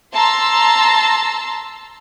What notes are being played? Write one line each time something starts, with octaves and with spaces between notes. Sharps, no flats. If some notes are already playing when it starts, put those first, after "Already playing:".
A5 A#5 C6 E6